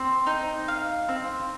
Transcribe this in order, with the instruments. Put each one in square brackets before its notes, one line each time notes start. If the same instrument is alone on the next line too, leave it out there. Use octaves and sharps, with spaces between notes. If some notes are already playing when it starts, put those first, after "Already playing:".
Already playing: [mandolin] C4 C5
D#4
F5
C4